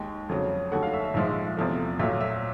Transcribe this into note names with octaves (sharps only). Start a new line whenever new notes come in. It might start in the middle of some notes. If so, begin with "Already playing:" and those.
Already playing: D#2 D#3 G#3 G5
F2 C#3 F#3
D#2 D3 F#3 A3 F#5
F5
E5
E5
A#1 G#2 F3 G#3 E5
E2 C3 F3 A3
A#1 A#2 F#3 A3 E5
E5